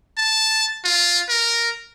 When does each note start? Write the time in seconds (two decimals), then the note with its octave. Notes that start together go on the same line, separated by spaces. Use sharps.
0.18 A5
0.84 F4
1.29 A#4